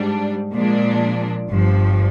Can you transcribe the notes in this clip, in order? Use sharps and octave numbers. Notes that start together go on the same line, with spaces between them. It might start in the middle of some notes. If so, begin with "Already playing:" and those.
Already playing: G#2 G3 D4
A#2 F3 G#3 D4
G1 G2 F3